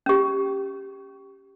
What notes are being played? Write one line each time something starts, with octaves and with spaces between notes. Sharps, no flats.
C#4 G4